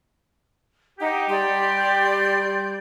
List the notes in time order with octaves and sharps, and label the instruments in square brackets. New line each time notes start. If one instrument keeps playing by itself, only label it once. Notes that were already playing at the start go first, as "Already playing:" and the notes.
[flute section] D#4 F#5 [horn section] G4
[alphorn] G3 [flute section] D5 C6 G6